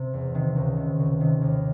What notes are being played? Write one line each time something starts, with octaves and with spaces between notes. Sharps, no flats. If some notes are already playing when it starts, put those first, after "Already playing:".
Already playing: C3
E2
C3 D#3
C#2
C3 D#3
C#2
C3 D#3
D#2